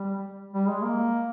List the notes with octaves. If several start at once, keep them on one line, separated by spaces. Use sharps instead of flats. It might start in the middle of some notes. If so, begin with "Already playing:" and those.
Already playing: G3
G3
G#3
A#3